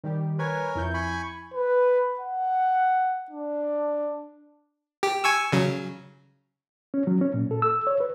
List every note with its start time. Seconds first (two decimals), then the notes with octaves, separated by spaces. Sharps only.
0.04 D#3 G3 G4
0.39 A#4 B4 C#5 G#5 G#6
0.75 F2 E4 G6
0.94 G#5 B5 C#6
1.54 B4
2.19 F#5
3.31 D4
5.03 G4
5.24 G#5 C#6 E6
5.52 C#3 F#3
6.94 C#4
7.07 F#3
7.21 C#4
7.34 A#2
7.51 A4
7.62 E6
7.87 C#5
8.00 B4